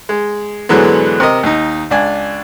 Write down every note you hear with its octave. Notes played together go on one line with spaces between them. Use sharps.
G#3
G#2 D3 E3 F#3 G#3 B3
C3 A#4 D#5
D#2 D#4
C#2 D4 G#5